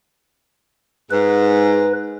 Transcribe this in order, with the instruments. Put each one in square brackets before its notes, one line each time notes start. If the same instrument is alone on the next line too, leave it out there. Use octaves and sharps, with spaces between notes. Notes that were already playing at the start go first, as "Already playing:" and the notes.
[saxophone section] G#2 [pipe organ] B4